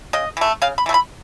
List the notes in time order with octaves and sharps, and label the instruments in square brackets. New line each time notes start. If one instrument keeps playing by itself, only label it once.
[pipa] C#3 D#5
E3 A3
C#3 F5
B5
E3 A3
B5